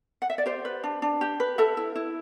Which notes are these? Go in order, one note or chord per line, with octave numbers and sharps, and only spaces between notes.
F#5
E5
D5
G4 C5
B4
D4
D4
G4
B4
A4 E5
E4
E4